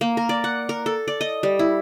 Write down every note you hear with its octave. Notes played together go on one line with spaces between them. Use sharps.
A#3
A#4
D5
F#5
A#4
A4
D5
D#5
G3
E4